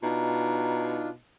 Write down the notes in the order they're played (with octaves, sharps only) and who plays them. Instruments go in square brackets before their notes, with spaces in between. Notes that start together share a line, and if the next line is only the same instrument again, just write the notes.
[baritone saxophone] B2 [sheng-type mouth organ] D4 F4 [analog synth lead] D#4 [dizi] A#5